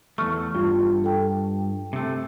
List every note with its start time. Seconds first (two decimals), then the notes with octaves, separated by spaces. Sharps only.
0.18 E2 A3 C#6 F6
0.55 G2 F4
1.04 A4 G5
1.93 C3 A3